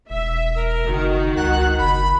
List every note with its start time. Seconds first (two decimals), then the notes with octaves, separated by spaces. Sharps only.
0.10 E1 E5
0.55 A#4
0.85 F#1 D#3 F#4
1.36 C#2 F#5
1.78 F#1 B5